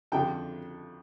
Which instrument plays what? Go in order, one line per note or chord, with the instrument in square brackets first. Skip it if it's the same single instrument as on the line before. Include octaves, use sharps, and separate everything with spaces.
[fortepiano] F2 D3 F3 G5